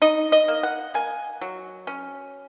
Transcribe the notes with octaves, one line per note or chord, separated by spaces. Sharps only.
D#4 D#5
D#5
A#3
F#5
A#3 G#5
F#3
C#4